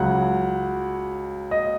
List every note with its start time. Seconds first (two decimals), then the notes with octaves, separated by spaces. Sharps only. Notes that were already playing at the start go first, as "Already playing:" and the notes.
Already playing: C#2 C#3 F#3 F#5
1.51 D#5